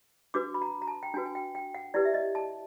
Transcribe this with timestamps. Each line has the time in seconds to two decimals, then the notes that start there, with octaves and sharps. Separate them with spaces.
0.34 D4 F#4 B4 D6
0.54 B5
0.62 A#5
0.82 A#5
0.88 A5
1.03 G5
1.14 D4 F#4 B4 G#5
1.26 G#5
1.35 G5
1.55 G5
1.75 F#5
1.94 E4 G4 B4 D5
2.05 E5
2.14 D#5
2.35 A5